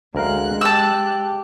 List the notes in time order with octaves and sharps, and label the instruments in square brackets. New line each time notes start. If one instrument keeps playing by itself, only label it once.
[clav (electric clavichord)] D2 A#4 F5 [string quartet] G#3 F#6
[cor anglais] G4 [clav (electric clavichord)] G5 [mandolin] A5 E6